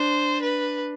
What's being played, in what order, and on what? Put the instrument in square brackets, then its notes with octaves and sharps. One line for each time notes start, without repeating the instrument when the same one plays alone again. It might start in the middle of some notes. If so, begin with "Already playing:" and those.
Already playing: [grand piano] D4 [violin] C5
[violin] B4